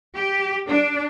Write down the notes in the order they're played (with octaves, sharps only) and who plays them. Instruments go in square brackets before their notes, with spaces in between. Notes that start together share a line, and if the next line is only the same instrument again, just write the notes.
[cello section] G4
D4